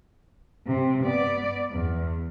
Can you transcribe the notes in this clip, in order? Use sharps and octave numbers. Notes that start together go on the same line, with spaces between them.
C3
B3 D5
E2